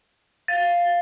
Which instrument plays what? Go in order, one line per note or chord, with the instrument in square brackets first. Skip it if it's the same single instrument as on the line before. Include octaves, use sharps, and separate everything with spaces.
[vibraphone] F5 [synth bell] A6